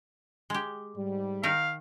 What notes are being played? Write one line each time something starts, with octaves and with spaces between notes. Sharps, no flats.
G#3 G4
G#2 G3
D#3 D#4 A#4 F5